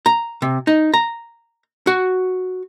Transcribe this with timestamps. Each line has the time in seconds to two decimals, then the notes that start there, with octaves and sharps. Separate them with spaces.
0.06 A#5
0.42 C3
0.67 D#4
0.94 A#5
1.87 F#4